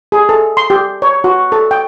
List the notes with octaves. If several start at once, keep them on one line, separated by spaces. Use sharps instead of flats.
G#4
A4
C6
G4
C#5
F#4
A4
G5